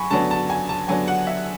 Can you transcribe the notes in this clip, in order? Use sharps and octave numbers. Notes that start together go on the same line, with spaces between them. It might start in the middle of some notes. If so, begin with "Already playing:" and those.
Already playing: F#3 G#5 B5 C#6
D3 F#3 B3 D4 A5
A5
G#5
A5
D3 F#3 B3 D4 G#5
F#5
E5